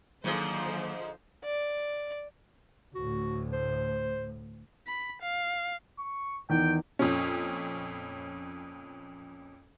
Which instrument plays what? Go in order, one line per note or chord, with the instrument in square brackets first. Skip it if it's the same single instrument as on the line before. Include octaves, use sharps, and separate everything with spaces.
[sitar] G#2 G#4 [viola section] D3 F3 C5 [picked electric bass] D#3 F#3 A#3
[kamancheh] D5
[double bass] D2 A2 [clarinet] F#4
[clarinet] C5
[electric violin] B5
F5
[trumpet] C#6
[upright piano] E2 D#3 [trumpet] G5
[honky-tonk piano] F2 A#2 C#4